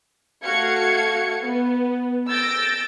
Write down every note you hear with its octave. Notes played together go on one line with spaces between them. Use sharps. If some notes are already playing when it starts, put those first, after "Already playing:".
A3 F#4 F5 G#6 C#7
B3
E6 G6 A6 A#6 D7